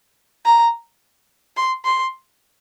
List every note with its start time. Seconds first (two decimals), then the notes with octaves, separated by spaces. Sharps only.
0.45 A#5
1.56 C6
1.85 C6